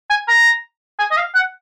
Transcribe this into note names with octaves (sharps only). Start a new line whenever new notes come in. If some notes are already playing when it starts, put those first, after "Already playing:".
G#5
A#5
G#5
D#5
F5
F#5